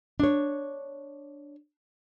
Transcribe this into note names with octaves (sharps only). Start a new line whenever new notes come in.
D4 C#5